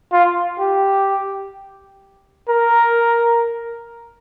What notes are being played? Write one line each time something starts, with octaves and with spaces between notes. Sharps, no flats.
F4
G4
A#4